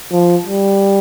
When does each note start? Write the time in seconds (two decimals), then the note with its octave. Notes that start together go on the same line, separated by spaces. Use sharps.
0.12 F3
0.46 G3